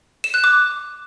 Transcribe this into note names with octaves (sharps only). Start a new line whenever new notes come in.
E7
F#6
D6